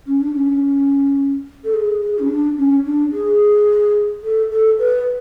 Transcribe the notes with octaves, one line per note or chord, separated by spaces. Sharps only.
C#4
D4
C#4
A4
G#4
G#4
C#4
D4
C#4
D4
G#4
A4
A4
B4